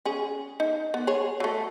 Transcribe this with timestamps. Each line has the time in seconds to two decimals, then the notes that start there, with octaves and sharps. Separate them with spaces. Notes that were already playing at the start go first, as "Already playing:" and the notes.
0.05 C#4 G#4
0.60 D#4
0.94 B3
1.07 G#4 C#5
1.40 F#3 A3